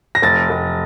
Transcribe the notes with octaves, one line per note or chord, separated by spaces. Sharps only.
A#6
F1 A6
F1